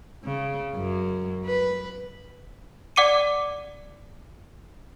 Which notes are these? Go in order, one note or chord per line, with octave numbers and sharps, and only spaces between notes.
C#3
F#2
B4
D5 F#5 D6 C#7 D#7